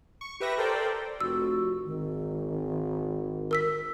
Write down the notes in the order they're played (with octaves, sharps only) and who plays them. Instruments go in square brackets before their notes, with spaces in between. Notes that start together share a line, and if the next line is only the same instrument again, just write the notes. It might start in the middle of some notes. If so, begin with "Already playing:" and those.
[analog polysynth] C#6
G4 B4 E5 A#6
A4 A#4 C5 D5 G5
[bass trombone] F1 [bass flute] F#4 [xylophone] E6
[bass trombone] G#1 [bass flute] D#3
[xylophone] A#4 E6 B6